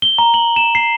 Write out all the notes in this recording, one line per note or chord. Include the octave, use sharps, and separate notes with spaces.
G7
A#5
F#7
E7
C7